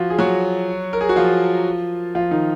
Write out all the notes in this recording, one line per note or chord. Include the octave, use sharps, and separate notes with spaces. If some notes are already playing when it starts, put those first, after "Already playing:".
Already playing: F3 F4 F#4
G#4
F#3 F#4
A#4
G#4
F#4
F3 F4
F3 F4
D#3 D#4